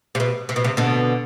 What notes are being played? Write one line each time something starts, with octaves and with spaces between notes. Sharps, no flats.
C3
B2
C3
B2
C3
B2 D3